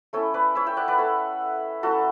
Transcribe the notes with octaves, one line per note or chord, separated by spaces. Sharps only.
A3 C#4 E4 A4 C#5
B4 D5
C#5 E5
E5 G5
D5 F#5
B4 D5
A4 C#5
F#3 C#4 E4 F#4 A4